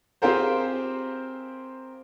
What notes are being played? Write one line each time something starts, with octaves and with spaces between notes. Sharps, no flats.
C4 F4 G4 G#4 A#4 C5